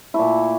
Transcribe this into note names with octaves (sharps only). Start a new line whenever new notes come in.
A#2 A3 E4